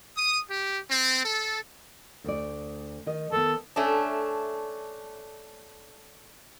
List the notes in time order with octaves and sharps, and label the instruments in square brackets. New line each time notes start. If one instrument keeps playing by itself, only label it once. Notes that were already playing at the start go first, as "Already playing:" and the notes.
[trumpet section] D#6
G4
C4
A4
[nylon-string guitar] D2 D5
D#3 D#5
[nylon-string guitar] D#3 B3 [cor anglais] A4
[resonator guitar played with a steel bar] A3 C#4 D4